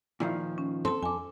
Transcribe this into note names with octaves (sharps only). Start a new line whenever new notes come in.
A#2 D#3 F3 E4
C#4
C4 A4 A5 C6
F2 G#5 D6